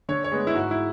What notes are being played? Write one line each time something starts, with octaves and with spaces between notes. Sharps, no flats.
D3 C#5
C#5
G#3 B3
E4
G#2 F#4
E4